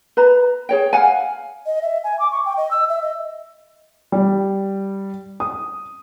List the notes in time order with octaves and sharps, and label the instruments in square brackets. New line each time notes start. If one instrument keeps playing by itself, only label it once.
[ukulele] B4 A#5
G#4 C#5 G5
F5 F#5 G#5
[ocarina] D#5
E5
G#5
D6
C#6
G5
D#5
E6
E5
D#5
[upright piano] G3
D#6